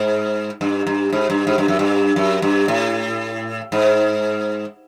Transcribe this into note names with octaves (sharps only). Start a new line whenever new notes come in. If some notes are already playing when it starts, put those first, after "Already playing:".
Already playing: G#2
G2
G2
G#2
G2
G#2
G2
F#2
G2
F#2
G2
A2
G#2